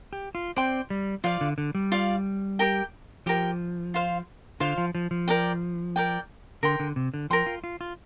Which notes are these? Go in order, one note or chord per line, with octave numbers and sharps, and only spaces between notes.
G4
F4
C4 D5 G5 C6
G3
F3 F4 D5 F5
D3
D3
G3
F4 D5 F5
G4 A#4 G5
F3 G4 A#4 G5
F4 C5 F5
D3 F4 C5 F5
F3
F3
F3
A#4 D5 G5
A#4 D5 G5
D3 A#4 G5 C6
D3
C3
D3
F3 A#4 G5 C6
F4
F4
F4